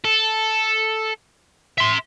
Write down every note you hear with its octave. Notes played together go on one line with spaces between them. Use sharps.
A4
E5 C6